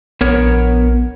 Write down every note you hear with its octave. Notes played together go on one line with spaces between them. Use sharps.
A#1 B3 A#4 C#5